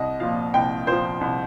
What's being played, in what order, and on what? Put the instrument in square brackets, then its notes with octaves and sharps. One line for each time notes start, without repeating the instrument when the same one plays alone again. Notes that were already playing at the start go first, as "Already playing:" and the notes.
Already playing: [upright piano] C2 D#5
A#2 F3 F5
C2 G5
A#2 F3 C5
C2